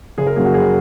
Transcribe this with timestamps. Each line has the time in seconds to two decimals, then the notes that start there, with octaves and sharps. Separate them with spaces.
0.18 F#1 G#4
0.27 A#4
0.36 F#2 F#3 A#3 G#4
0.45 F#4
0.54 F#1 G#4